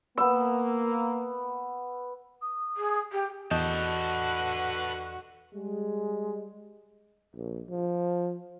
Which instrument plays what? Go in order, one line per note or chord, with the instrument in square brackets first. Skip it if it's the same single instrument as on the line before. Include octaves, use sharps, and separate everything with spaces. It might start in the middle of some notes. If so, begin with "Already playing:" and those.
[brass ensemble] A#3 [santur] B3 E6
[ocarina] D#6
[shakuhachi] G#4
G4
[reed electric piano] E2 D#5 G6 [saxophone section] D3 F#4 [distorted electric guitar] B4 A5
[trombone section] G3 G#3
[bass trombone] A#1
F3